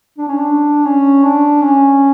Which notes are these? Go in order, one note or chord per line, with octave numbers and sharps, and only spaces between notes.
D4
C#4
D4
C#4
D4
C#4